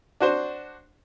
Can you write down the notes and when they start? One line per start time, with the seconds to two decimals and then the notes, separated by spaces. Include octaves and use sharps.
0.20 D4 F#4 C5